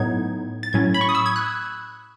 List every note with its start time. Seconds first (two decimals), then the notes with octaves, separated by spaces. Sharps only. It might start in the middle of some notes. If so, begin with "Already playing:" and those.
Already playing: A2 F#3 B3 D#4 G#6
0.63 A6
0.73 A2 F#3 C#4 G#6
0.94 B5
1.01 C#6
1.09 D#6
1.15 E6
1.26 G#6
1.36 F#6